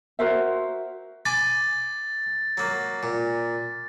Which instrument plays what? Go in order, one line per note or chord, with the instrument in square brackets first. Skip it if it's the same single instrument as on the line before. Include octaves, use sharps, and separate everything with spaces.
[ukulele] F#4 A#4 C5 E5
[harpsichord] G#5 B5 D6 [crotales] A6
[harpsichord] F#3 A#3
A#2